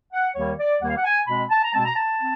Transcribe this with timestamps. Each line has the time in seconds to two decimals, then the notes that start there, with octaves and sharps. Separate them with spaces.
0.13 F#5
0.35 D#2 D#3 G3 A#3 C#5
0.59 D5
0.81 D#2 D#3 G3 A#3 F#5
0.89 F5
0.96 F#5
1.05 G#5
1.27 B2 G#3 C4 B5
1.50 A5
1.64 A#5
1.73 B2 G#3 C4 A5
1.86 A#5
1.96 A5
2.19 C4